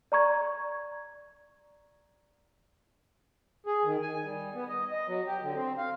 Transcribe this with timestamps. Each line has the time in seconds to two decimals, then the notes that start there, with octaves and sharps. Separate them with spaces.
0.12 D5 A#5 C#6 G#6
3.66 G#4
3.84 D#3
4.02 G#5
4.24 G3
4.54 B3
4.68 D#5
4.92 D#5
5.08 F#3
5.27 G4
5.42 D3
5.54 C4
5.78 F5